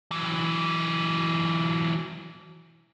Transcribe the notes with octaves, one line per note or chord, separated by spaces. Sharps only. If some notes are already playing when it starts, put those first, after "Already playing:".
E3 F#3